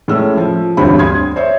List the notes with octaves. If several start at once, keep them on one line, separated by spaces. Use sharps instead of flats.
A2 G#3 C#4 E6
F3
E1 D2 G2 C4 C#5 B5
C6 D#6 G#6
C5 C#5 E5